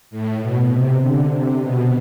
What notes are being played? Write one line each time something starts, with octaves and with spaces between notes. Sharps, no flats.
A2
B2
C3
D3
C3
B2